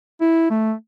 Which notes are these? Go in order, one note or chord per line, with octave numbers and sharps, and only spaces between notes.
E4
A3